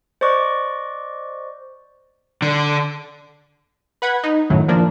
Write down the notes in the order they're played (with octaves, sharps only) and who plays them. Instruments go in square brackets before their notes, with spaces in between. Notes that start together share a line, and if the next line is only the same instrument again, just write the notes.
[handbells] C5 D5 D#5 C#6 D6 F#6
[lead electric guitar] D3
[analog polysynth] B4 F#5 B5 G#6
D#4
F#2 A2 D#3 F#3
F3 A#3 D4